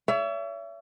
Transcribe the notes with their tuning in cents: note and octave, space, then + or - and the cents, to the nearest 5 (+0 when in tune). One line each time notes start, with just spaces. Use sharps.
C#5 +40 E5 +30